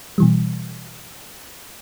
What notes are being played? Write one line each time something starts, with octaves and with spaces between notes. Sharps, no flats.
B2 E3 G3